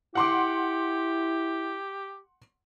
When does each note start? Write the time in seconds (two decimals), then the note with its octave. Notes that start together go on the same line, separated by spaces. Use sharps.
0.15 E4 G4 F#5 C6 D6